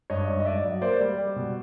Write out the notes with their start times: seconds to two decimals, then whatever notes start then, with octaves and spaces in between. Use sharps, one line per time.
0.10 G2 C#5 D#5
0.28 G2
0.40 D#5
0.45 G2 D5 E5
0.64 F#3
0.81 A#3 C5 D5
1.00 G3
1.18 G3
1.36 B2